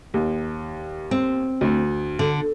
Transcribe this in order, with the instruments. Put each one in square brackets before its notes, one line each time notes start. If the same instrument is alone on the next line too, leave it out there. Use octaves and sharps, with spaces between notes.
[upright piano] D#2
[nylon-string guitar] C4
[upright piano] D2
[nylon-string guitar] D3